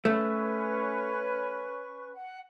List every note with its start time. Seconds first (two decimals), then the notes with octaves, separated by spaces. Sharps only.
0.05 A3 C#4 B4 C#6
2.12 F#5